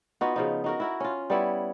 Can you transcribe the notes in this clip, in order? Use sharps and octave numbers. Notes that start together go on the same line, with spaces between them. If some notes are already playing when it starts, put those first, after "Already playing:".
B3 D#4 F4 F#4
C#3 F3 D#4
D#4 F#4 A#4
E4 F#4 A#4
C#4 F4
G3 B3 E4 C#5